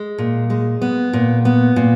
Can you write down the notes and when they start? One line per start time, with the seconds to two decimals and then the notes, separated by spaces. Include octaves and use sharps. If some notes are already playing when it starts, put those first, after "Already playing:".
Already playing: G#3
0.18 A#2
0.50 G#3
0.82 B3
1.13 A#2
1.45 B3
1.76 A#2